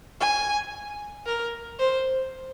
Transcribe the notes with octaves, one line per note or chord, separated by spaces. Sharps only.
G#5
A#4
C5